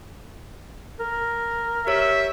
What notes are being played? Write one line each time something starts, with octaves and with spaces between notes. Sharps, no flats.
A#4
G4 C#5 E5